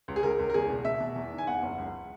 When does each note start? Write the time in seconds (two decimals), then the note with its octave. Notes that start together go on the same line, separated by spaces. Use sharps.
0.08 C#2
0.16 G#4
0.23 C#2 A#4
0.39 C#2
0.50 A#4
0.54 E2 G#4
0.70 B2
0.85 B2 E5
1.00 B2
1.16 E2
1.32 D#3
1.38 G#5
1.47 E2 F#5
1.63 F#1
1.78 C#2